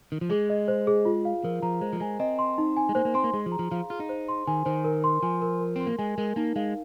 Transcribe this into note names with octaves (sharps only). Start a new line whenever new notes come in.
D#3
F3
G#3 G#4
D#5
C5
G#4
F4
F5
F3 A#4
F3 A#5
G#3 C5
F3
G#3 G#5
C4 D#5
C6
D#4
G#5
G#3
A#3 C5
A#3
C4 C6
A#3
G#3 G#4
F3
A#5
F3
F3 F5
F4 G#4
D#4
C5
C6
D#3 G#5
D#3 C5
A#4
C6
F3 G#5
A#4
A#4
C4 C6
A#3
G#3 G#5
G#3 A#4
A#3 D#4
G#3 F5